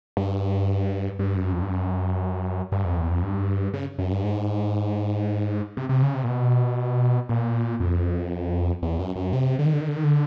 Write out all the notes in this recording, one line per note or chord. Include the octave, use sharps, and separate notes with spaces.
G2
G2
F#2
F2
G2
F#2
G2
F2
E2
F2
G2
C#3
F#2
G2
G#2
C3
C3
C#3
C3
A#2
B2
A#2
F2
E2
F#2
F#2
C3
D3
D#3
D3
D#3
D3
D#3
D3